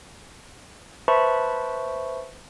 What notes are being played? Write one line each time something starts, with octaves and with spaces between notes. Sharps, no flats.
B4 C5 E5 A5 B5 C#6